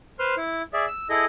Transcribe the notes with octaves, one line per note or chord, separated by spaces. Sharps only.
B4 C5 C6 F6
E4
G#4 D5 E5
E6
E4 G#4 A4 D#5